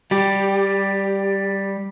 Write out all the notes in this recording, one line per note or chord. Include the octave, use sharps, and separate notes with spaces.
G3 G4